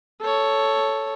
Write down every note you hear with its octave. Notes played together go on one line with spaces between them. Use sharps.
A4 C#5